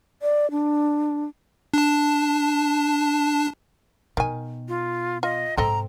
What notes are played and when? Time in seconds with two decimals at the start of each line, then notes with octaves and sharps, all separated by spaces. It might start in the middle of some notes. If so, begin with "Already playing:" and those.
0.22 D5
0.51 D4
1.74 D4 A5
4.17 B2 D#3 G#5
4.68 F4
5.23 F4 D#5
5.58 G#2 C3 C4 A4 D#5 A#5